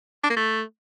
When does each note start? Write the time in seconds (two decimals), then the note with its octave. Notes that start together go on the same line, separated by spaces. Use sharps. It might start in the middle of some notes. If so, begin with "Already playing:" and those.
0.24 D4
0.30 A#3
0.36 A3